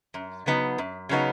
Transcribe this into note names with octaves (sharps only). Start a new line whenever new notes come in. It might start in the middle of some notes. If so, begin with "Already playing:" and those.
F#2
C#3 F#3 B3 D#4
F#2
C#3 F#3 B3 D#4